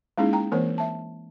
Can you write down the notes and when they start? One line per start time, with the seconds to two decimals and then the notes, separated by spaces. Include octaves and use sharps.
0.18 G#3 A#3 C#4 D#4 E4 G#4
0.33 G5 A#5
0.52 E3 A#3 C4 A#4 C5
0.78 E5 A5